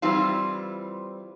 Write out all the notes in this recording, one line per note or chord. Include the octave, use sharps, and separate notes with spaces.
E3 G3 C4 F4